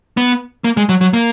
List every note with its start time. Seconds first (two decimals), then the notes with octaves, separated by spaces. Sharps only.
0.17 B3
0.64 A#3
0.77 G#3
0.89 F#3
1.01 F#3
1.13 A#3